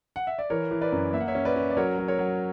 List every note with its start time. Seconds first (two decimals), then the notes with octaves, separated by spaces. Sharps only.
0.16 F#5
0.27 E5
0.39 D5
0.50 E3 A#4 C#5
0.71 E3
0.81 B4 D5
0.92 F#2
1.13 A#3 E5
1.20 F#5
1.28 C#5 E5
1.35 C#4
1.45 B4 D5
1.56 C#4
1.70 D5
1.77 F#3 A#4 C#5
1.98 F#3
2.08 A#4 C#5
2.18 F#3